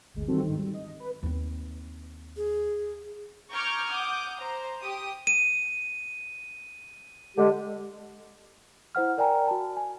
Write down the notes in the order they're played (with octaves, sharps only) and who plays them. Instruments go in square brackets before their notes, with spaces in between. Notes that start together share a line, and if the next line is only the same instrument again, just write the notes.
[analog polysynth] G1 D2 G#3
D#3 E3 G3 C4 F#4 A4
G#2 D3 D#3
G3
D#5
B4
[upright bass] D#2 C4
[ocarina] G#4
[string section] A#5 C#6 D6 F6 G6 G#6
F#5 D6 D#6 G6
C5 A#5
G4 D#6
[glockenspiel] D#7
[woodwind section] D3 G#3 G4
[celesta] E4 C5 F#5 F6
A#4 D5 G5 G#5 A#5
F#4 A5
G#5